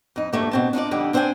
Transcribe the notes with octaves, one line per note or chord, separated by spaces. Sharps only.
F2 D#4
D2 G2 A3 A#3
B2 C4 A5
D4 D#4 F4 D5
F2 D3 G3 D#4
C4 D4 C5 D5 G5 G#5